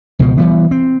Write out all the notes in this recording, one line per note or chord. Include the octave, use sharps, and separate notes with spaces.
C#2 B2 F3
E3 G3 B3
C4